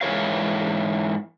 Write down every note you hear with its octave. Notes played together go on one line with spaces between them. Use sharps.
G#2 E3 A#4 C#5 F5